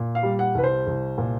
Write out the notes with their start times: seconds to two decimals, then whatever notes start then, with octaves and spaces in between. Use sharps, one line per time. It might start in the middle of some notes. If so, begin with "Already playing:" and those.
Already playing: A#2
0.15 F5
0.23 G3
0.39 F#5
0.55 C2 B4
0.64 C5
0.87 C2
1.18 A#2